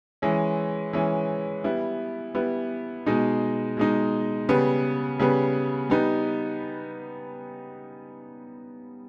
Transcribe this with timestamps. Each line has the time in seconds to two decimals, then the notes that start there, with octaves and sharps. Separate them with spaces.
0.22 E3 G#3 C#4
0.93 E3 G#3 C#4
1.64 G3 B3 E4
2.35 G3 B3 E4
3.06 B2 G#3 D#4
3.77 B2 G#3 D#4
4.49 C#3 G3 B3
5.20 C#3 G3 B3
5.90 G3 B3 D#4